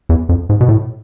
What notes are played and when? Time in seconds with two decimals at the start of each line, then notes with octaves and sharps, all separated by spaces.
0.09 E2
0.29 F2
0.49 G#2
0.61 B2
0.69 A2